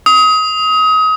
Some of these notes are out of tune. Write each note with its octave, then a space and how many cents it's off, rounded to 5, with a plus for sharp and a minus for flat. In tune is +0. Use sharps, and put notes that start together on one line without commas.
D#6 +30